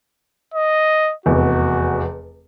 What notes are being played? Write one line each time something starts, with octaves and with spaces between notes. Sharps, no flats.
D#5
F1 E2 F#4